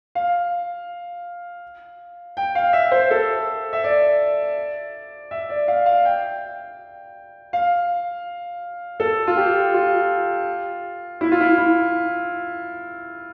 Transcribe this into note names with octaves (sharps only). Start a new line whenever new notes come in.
F5
G5
F5
E5
C5
A4
E5
D5
E5
D5
F5
F5
G5
F5
A4
F4
G4
F4
E4
F4
E4
E4